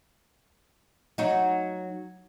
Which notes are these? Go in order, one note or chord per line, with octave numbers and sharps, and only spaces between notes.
F#3 D#4 F#4